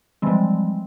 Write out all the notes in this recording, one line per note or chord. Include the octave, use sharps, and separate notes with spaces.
E3 F3 G3 G#3 C4